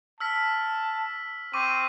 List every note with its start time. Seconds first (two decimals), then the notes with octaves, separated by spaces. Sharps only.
0.20 A5 E6 F6 B6
1.53 C4 C#6 D6 D#7